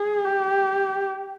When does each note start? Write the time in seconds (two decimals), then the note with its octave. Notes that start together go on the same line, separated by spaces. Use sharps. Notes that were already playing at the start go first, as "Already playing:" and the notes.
Already playing: G#4
0.25 G4